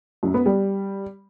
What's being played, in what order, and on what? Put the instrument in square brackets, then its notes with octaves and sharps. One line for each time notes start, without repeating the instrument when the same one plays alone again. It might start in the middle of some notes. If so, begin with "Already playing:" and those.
[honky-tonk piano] F#2
B3
G3